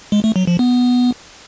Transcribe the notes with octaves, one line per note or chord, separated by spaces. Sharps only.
G#3
A3
F#3
F3
B3